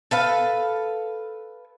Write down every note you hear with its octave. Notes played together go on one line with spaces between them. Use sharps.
A4 B4 F5